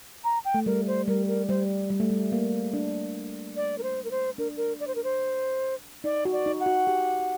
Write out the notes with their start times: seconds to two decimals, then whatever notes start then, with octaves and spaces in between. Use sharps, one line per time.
0.24 A#5
0.45 G5
0.54 A3
0.66 G3 A#4
0.87 C5
1.08 G3 A#4
1.28 A#4
1.49 G3 C5
1.90 G3
2.00 A3
2.10 G3
2.32 A#3
2.74 D4
3.56 D5
3.78 A#4
3.83 C5
4.04 A#4
4.11 C5
4.38 D4 A#4
4.57 A#4
4.80 D5
4.87 C5
4.95 A#4
5.04 C5
6.04 D#4 D5
6.25 F#4
6.33 D5
6.46 D#4
6.60 F#5
6.66 F#4
6.87 G4